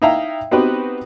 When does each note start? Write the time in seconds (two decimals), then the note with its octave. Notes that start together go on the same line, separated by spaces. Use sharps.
0.02 D#4 E4 E5 F5 G5 A#5
0.51 B3 C4 D#4 F#4 G4 B4